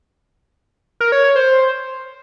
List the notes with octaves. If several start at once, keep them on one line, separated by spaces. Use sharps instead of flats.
A#4
C#5
C#5
C5